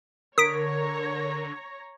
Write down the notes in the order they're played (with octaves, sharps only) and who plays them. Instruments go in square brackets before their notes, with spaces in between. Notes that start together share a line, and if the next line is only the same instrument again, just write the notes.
[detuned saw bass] D3 [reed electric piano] A#4 [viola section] C#5 A#5 [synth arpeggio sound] D#6 B6 D7